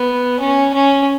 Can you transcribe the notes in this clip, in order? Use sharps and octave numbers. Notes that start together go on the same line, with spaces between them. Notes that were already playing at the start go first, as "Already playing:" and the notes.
Already playing: B3
C#4
C#4